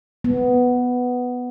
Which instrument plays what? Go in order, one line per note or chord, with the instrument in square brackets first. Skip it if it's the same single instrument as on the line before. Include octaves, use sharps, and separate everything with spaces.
[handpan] B3